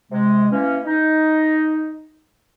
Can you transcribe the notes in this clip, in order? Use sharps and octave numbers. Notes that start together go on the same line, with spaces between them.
C3 G#3
E3 A#3 C#4
D#4